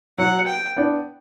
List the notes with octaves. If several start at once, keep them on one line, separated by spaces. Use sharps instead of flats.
F#3 F#5
G5
B3 D4